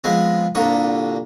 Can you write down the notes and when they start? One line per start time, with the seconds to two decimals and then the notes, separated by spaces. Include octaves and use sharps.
0.04 F3 G#3 B3 C4
0.55 C2 A#2 D3 C#6 D#6